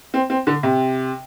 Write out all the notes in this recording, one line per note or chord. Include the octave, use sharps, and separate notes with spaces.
C4
C4
D3
C3